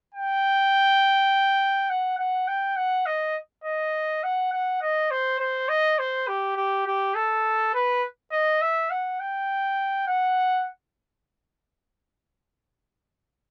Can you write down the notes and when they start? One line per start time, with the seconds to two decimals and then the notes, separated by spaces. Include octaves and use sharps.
0.14 G5
1.90 F#5
2.18 F#5
2.48 G5
2.76 F#5
3.06 D#5
3.64 D#5
4.24 F#5
4.52 F#5
4.81 D#5
5.11 C5
5.39 C5
5.69 D#5
5.99 C5
6.27 G4
6.56 G4
6.86 G4
7.15 A4
7.74 B4
8.32 D#5
8.61 E5
8.90 F#5
9.20 G5
10.08 F#5